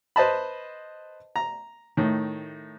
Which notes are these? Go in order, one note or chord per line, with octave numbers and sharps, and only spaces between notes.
B4 C5 D#5 A5 B5
A#5
A2 D#3